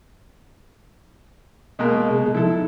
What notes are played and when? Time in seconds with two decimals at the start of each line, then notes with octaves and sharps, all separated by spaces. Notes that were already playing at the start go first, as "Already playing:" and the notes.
1.79 B2 G#3 A#3 D#5
2.11 C3 G#4
2.35 F3 D#4 E4 A4